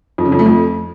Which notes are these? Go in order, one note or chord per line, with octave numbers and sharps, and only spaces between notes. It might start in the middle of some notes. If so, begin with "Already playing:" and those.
F2
C#3
F2
A3
F2